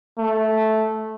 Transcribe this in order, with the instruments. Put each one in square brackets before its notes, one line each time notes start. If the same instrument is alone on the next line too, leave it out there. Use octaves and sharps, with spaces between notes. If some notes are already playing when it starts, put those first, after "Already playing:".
[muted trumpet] A3